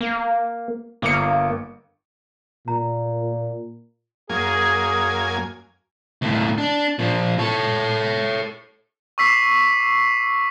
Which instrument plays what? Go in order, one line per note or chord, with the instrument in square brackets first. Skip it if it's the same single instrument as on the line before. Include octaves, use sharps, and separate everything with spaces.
[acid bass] A#3
[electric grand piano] G1 D6 C#7 [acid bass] A#3
[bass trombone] A#2 [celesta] A#5
[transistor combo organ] F#2 A#3 G#5 [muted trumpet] G#4
[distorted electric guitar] D#2 A2
D4
A#2 F3
A4 C#5
[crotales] C#6 D6 E6 B6 C7